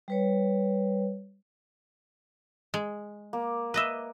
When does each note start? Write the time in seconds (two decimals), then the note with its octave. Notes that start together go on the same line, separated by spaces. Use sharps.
0.08 G3 B4 C#5
2.74 G#3
3.33 A#3
3.74 B4 D#5 E5